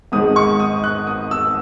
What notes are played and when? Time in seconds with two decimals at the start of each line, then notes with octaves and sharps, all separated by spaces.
0.12 G#1 G#2 D#3 G#3 D#6
0.36 C#6
0.60 D#6
0.84 F#6
1.07 D#6
1.31 E6